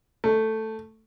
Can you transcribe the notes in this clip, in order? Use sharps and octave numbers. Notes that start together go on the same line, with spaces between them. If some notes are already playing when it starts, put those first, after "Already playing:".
A3